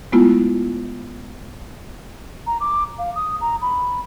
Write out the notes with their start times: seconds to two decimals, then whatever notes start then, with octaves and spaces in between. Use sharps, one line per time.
0.12 G#3 A3 B3 E4 F4
2.47 A#5
2.60 D6
2.99 F5
3.16 D#6
3.41 A#5
3.61 B5